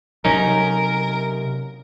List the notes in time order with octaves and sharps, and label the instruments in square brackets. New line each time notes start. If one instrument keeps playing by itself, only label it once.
[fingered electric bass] C3 F#3 [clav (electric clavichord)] C#4 D#4 [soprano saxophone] A#4